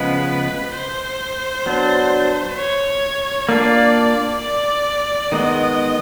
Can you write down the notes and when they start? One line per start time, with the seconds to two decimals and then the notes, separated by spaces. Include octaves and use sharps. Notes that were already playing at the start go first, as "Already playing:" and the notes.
Already playing: C#3 F3 G#3 B3 B4
0.75 C5
1.66 F#3 B3 D4
2.57 C#5
3.49 A#3 D4 F4 D5
4.40 D5
5.32 D#3 G#3 B3 D#5